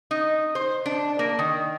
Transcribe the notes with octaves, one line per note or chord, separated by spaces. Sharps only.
D#4
C5
D4
A#3
D#3